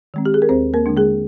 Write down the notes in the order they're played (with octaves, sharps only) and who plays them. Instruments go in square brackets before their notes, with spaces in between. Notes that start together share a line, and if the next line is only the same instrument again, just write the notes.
[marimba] D#3 G#3 C4
G4
G#4
A#4
D#2 C4 C5
A#3 A#4
D3 G#3 D4
G#3 G#4